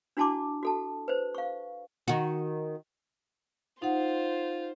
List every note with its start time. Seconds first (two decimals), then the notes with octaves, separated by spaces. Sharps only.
0.17 D4 E4 F#4 A5 C6 D6
0.63 F#4 A4 A5
1.08 B4 C5
1.35 F5 C#6
2.08 D#3 F#4
3.82 D#4 F4 C5 F#5